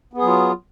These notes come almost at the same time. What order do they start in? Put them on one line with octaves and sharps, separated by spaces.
B3 G#4 F#3 F4